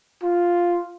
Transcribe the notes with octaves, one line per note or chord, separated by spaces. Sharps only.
F4